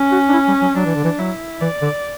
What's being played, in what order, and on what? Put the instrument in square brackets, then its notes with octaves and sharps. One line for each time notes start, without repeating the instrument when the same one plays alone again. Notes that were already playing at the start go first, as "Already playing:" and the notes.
Already playing: [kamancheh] C#4
[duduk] F#4
D4
E4
G3
F#3
[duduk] F#3 [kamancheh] D4
[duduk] E3
D3
E3
[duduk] F#3 [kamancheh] E4
[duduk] E3 [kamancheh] D5
[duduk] D3